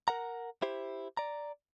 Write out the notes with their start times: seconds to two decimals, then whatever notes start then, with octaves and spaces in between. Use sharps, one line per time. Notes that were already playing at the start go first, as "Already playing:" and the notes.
0.08 A#4 F#5 A#5
0.62 E4 G4 C5
1.17 D5 A#5